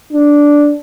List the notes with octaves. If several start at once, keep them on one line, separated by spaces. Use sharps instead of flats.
D4